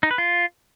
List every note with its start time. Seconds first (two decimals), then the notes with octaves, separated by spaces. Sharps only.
0.03 D#4
0.11 B4
0.18 F4